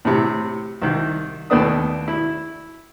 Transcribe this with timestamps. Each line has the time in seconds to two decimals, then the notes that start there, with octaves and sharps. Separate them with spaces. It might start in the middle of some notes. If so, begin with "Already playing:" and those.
0.05 A2 C3
0.82 C2 D#3
1.50 D#2 A3 B3 D4 D#6
2.08 E4